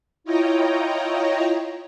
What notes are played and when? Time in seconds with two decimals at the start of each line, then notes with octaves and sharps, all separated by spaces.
0.24 E4 F4 C#5 D#5 G5 A#5